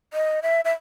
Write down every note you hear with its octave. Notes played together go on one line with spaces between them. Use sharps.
D#5
E5
E5